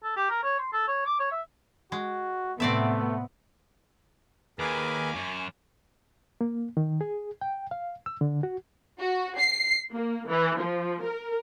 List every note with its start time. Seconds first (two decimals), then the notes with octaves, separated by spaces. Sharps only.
0.03 A4
0.16 G4
0.30 A#4
0.44 C#5
0.59 C6
0.73 A4
0.88 C#5
1.06 D6
1.20 C#5
1.31 E5
1.92 G#3 F#4
2.60 A2 C3 A3 B3 C4 D5 E5
4.59 D#2 G#4 A#4 B4 G#5 D6
5.15 F#2 C#6
6.41 A#3
6.77 D#3
7.01 G#4
7.41 G5
7.71 F5
8.06 E6
8.21 D3
8.43 F#4
9.00 F#4
9.39 C7
9.91 A#3
10.28 E3
10.58 F3
11.03 A#4